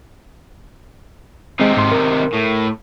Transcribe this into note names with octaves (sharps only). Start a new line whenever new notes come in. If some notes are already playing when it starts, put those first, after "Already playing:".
C3 D#3 G#3 C4
G#2 C6
A#4
A2